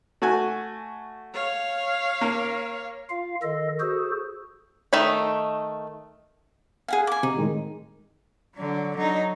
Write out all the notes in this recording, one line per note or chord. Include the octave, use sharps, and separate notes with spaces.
A3 F#4 G#5
C#5 F5
A#3 A#4
F4 F5
D#3 A4 D#5
F#4 G#4 A4 C5
D#3 A3 D#4 B5
G#4 F5 F#5 G#5
G#5 D6
C3 D#4
A2 D#3 G#3
D3 F#3
F#3 D#4